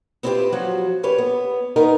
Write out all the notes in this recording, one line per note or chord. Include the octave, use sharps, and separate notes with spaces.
B3 C4 E4 F4 G4 B4
F3 F#3 F#4 C5
C#4 G4 B4 C#5
B3
D#3 B3 D#4 A#4